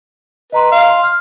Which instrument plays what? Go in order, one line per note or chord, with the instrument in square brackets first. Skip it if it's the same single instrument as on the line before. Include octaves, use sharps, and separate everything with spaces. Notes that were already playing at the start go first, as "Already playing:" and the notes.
[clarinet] B4 [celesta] D#5 A#5 C6
[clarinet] F5
[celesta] C6
F6